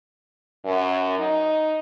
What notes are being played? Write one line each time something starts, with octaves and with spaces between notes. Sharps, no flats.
F#2
D#4